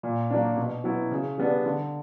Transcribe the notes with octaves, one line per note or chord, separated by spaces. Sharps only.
A#2
F#3 A#3 D4
B2
F#3 B3 E4
C#3
G3 B3 D4
D3